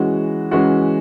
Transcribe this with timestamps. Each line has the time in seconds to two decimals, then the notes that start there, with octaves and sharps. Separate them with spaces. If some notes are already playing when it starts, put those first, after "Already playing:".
Already playing: E3 G#3 C#4 F#4
0.51 E3 G#3 C#4 F#4